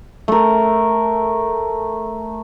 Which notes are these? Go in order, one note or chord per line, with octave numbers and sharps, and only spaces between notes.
A3 A#4